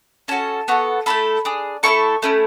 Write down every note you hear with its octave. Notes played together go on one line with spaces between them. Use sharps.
C#4 F#4 A4 A5
B3 F#4 A4
A3 C#4 E4 A4 B5
D4 G#4
A3 C#4 E4 A4 C#6
A3 C#4 E4